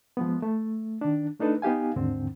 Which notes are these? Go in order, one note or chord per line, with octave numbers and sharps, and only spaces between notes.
F3 G#3 B3
A3
D#3 D4
A3 D4 D#4 A4 B4
B3 D#4 G4 F5 G#5
D#2 G#2 D3 C4